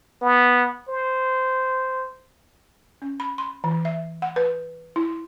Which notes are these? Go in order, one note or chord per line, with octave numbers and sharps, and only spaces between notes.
B3
C5
C#4
B5
C6
E3
E5
F#5
B4
E4